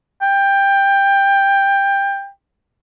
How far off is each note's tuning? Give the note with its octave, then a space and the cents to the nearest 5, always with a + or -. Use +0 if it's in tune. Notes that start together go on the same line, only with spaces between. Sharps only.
G5 +15